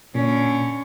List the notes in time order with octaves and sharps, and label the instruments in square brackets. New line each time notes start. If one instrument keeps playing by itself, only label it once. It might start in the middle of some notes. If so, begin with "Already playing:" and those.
[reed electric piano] A#2 [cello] D3 C#4